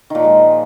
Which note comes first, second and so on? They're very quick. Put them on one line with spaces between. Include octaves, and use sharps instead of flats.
D#3 A#2 F3 G#3